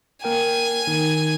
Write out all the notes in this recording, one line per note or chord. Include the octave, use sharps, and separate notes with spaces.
A#3 A#4 G5 G#5
D#3